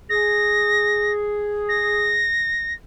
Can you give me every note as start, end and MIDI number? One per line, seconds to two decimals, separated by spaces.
0.10 2.30 68
0.10 1.13 94
1.69 2.74 94